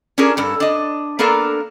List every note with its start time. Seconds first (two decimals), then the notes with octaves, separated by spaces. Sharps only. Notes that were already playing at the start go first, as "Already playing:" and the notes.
0.18 C#4 D4 F4 G#4 A#4
0.37 G2 A4
0.60 D4 D#5
1.19 A#3 B3 D4 A4 A#4 F5